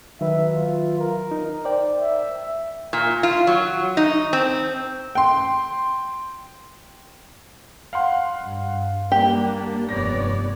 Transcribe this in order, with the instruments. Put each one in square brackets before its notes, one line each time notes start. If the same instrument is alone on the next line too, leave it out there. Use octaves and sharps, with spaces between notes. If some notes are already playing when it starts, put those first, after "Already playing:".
[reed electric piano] D#3 F#3 B4 [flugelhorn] E5
[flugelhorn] F4
A#4
[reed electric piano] D#4
C5 D5 G5
[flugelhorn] E5
[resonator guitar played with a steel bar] A#2
F4
F#3
D#4
C4
[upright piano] G5 C6
F5 F#5 C6
[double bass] G2
[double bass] G3 [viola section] A#3 D4 [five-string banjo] G4
[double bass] F1 G2 [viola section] B3 C#5 D5 [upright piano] A#6